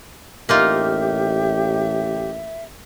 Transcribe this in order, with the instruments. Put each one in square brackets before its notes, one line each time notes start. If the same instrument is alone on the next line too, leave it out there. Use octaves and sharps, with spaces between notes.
[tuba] A1 [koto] A#3 D#4 F4 [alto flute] G4 [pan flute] E5